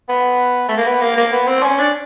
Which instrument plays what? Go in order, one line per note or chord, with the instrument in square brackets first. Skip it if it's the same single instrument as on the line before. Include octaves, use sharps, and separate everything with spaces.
[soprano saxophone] B3
A3
A#3
B3
A#3
A#3
B3
C4
C#4
D4